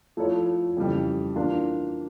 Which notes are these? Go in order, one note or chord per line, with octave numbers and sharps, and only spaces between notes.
F3 A3 E4 A4 C#5
F2 C#3 E3 G3
E3 A#3 D4 F4